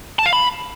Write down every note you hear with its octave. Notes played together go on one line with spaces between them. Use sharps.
A5
F5
B5